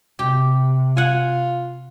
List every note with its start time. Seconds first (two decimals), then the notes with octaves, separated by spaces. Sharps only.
0.19 C3 G4
0.97 F4 F#5 G#5